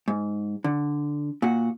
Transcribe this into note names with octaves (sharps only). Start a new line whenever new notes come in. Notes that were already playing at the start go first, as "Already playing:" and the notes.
G#2
D3
A#2 F#4